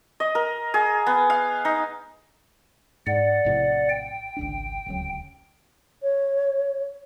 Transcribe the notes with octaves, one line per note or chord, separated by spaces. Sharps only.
D#5
A#4
G#4
B3
F5
D#4
G#2 D5 F#5
A#1 A2 C3
G5
G#1 C#2 D4
D1 C#2 F#3
C#5